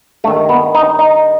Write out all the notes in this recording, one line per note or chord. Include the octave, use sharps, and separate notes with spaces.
G2 D#3 A3
B3
D#4
D#4